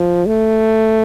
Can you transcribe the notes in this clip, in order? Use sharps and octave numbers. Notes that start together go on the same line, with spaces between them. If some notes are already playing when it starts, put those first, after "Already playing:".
Already playing: F3
A3